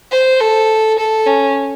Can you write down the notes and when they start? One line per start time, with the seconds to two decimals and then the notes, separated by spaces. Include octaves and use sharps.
0.11 C5
0.40 A4
0.98 A4
1.26 C#4